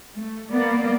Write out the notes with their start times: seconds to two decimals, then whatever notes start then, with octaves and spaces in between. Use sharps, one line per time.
0.17 A3
0.52 A#3 B3 D5